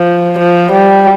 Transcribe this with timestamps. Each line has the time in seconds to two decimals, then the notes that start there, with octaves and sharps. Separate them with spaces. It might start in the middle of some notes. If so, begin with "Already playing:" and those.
Already playing: F3
0.39 F3
0.72 G3